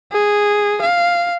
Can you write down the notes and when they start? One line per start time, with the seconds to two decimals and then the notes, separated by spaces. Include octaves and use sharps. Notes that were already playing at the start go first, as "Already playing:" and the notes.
0.12 G#4
0.81 F5